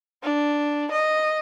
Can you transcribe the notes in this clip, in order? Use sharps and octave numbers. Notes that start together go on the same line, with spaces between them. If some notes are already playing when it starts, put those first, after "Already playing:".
D4
D#5